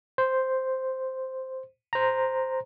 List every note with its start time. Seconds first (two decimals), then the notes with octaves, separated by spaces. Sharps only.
0.18 C5
1.93 C5 A#5